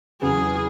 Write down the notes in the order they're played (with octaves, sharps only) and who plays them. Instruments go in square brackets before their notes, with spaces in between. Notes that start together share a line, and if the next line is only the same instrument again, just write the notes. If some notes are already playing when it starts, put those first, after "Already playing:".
[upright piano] E2 C#3 F#3 [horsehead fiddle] G#4